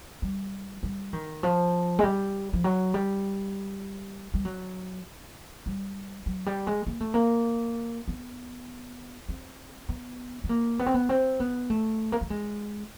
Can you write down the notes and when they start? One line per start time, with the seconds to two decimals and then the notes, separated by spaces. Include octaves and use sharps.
0.22 G3
0.83 G3
1.13 D#3
1.43 F3
1.99 G#3
2.03 G3
2.53 F3
2.64 F#3
2.94 G3
4.34 G3
4.45 F#3
5.66 G3
6.26 F#3
6.46 G3
6.67 G#3
6.87 A#3
7.00 A3
7.14 A#3
8.08 B3
9.29 C4
9.89 B3
10.44 B3
10.49 A#3
10.79 B3
10.86 C4
10.94 B3
11.09 C4
11.40 B3
11.70 A3
12.12 A#3
12.21 A3
12.30 G#3